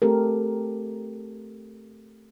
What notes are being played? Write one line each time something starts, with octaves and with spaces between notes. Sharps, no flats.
A3 C4 G4 A4 A#4